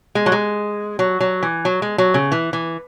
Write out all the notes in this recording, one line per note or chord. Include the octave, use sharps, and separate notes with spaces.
G#3
F#3
G#3
F#3
F#3
E3
F#3
G#3
F#3
C#3
E3
E3